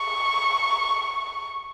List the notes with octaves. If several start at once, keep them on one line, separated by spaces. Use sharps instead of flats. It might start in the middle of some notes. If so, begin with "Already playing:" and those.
Already playing: C#6